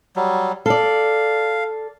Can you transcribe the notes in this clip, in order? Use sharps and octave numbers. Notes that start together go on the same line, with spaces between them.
F#3 G3
A4 D5 F5